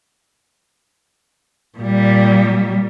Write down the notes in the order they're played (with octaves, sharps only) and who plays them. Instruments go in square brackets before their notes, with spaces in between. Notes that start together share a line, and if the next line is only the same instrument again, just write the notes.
[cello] A#2 G3